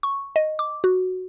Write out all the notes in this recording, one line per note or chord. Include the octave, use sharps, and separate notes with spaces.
C#6
D#5
D6
F#4